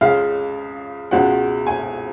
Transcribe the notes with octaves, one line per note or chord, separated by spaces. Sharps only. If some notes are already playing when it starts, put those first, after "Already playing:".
C#2 C#3 G#3 F5
C#2 B2 G#3 F#5
G#5